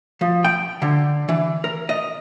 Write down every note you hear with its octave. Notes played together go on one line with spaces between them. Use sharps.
F3
G5
D3
E3
A#4
D#5